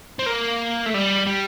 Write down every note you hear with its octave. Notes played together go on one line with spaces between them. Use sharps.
C4
A#3
A3
G3
G3